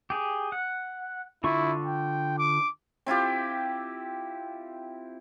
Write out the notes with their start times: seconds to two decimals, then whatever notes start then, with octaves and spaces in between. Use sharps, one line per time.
0.10 G4 G#4
0.52 F#5
1.44 D3 E4 F4 C#6
1.85 G5
2.38 D6
3.06 C4 E4 F4 G4